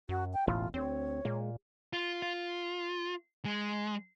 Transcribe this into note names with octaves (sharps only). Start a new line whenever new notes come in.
F#2 F#4
G5
E1 A1 A2 F4
D2 C4 C#5
A#2 G#3
F4
F4
G#3